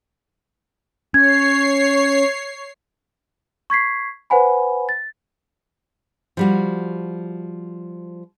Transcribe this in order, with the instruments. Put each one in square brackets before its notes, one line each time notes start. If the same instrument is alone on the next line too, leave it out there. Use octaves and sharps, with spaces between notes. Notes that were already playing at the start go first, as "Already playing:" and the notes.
[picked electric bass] C#4 [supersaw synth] C#5 C7 [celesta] G#6
[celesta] C#6 G#6 B6 C7
B4 C5 F#5 G#5 B5
A6
[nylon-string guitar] F3 G3 F#4